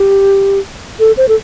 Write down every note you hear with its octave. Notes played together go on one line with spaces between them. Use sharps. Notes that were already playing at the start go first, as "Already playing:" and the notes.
Already playing: G4
A4
C5
A4